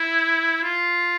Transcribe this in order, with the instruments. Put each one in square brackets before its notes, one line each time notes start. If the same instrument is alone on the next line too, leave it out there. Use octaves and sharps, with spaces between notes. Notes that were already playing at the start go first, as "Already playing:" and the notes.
Already playing: [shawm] E4
F4